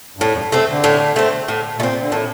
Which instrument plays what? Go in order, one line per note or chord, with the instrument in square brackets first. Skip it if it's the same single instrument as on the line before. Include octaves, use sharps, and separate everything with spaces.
[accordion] G2
[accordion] F2 [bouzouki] A2
[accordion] F2
G2
[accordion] C3 [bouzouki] A3 C4
[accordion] D3
[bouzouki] A2
A3 C4
A2
[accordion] A#2 [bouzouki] A3
[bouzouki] C4
[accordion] C3
D3
[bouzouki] A2 [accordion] D#3